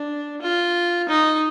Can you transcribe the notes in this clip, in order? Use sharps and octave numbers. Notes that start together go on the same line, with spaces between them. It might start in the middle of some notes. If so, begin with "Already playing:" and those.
Already playing: D4
F4
D#4